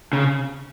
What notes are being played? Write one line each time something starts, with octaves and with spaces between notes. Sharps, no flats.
C#3